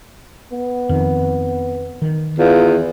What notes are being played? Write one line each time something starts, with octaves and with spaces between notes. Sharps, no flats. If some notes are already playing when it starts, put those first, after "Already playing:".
B3
F2 D#3
D#3
E2 F4